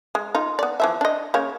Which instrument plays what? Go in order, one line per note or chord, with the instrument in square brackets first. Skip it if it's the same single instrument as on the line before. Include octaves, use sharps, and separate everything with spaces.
[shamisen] G#3
D#4 F4
B3 D5
E3 F3 E5
D4 D#5
C#3 A#3 C#5